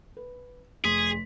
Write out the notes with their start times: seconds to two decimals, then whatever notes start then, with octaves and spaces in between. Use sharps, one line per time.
0.17 B4
0.84 F1 G#4 C6 B6